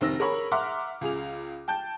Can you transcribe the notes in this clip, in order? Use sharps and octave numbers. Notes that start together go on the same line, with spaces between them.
F1 D#3 C4 E6 A#6
G#4 A#4 C#5 B5 C#6
E5 F#5 A#5 C6 D6 F6
C#2 G#4 F7
G5 A5 G6